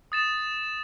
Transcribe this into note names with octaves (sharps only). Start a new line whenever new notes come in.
D#6 A6 E7